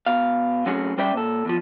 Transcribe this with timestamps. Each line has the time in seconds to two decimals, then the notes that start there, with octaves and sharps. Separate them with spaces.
0.06 B2 F5
0.66 F#3 A3 C4 C#4 F#4 G#4
0.98 G3 C#4 C5 D5 E5 G5
1.14 A#2 A4
1.45 E2 F3